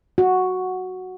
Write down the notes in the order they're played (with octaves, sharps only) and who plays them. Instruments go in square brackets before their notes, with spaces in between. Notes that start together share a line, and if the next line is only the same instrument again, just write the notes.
[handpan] F#4